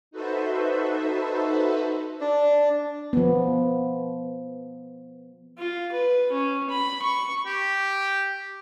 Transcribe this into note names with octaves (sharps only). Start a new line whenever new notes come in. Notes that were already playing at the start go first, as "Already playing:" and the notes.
D#4 F#4 A4 B4 C5 E5
D4
F3 B3
F4
B4
C#4
B5
C#6
G4